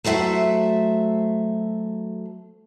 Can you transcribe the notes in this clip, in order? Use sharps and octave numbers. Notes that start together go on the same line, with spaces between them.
F#3 A3 C5 E5 F#5